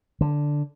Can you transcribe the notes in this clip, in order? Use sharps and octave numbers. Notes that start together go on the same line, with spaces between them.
D3